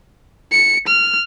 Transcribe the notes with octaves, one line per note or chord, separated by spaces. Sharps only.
C#7
F6